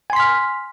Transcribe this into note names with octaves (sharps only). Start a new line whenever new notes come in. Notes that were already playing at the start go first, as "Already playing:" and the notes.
G#5 C6 F6 B6